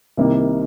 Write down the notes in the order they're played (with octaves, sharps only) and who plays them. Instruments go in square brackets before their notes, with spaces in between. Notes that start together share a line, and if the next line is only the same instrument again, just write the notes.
[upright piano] C2 C3 D#3 G3 A#3